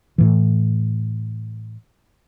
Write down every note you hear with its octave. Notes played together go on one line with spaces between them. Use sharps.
A2 E3